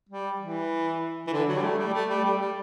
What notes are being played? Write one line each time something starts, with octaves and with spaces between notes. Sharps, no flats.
G3
E3
E3
D3
F#3
G3
A3
G3
A3
G3
G3
G3